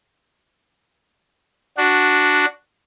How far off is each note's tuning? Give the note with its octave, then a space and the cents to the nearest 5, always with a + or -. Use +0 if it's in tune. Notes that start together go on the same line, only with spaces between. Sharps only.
D4 +0 F#4 +0